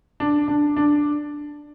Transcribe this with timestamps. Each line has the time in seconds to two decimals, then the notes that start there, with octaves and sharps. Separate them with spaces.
0.20 D4
0.48 D4
0.76 D4